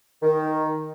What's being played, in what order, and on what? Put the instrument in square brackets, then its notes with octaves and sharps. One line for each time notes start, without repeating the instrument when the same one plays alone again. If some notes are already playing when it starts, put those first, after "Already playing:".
[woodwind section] D#3